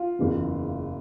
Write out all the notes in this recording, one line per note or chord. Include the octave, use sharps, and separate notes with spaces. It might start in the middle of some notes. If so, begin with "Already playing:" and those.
Already playing: F4
F#1 E2 C#3 E3